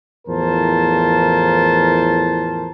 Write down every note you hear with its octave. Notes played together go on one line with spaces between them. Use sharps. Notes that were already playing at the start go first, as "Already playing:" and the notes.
E2 A2 F3 A#4 C5 A5